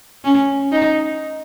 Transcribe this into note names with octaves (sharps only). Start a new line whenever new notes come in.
C#4
D#4